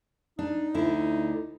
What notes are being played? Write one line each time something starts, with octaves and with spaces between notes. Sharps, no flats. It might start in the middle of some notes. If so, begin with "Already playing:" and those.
D4 D#4
D2 D3 E4